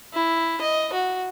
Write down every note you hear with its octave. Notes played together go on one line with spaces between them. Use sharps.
E4
D#5
F#4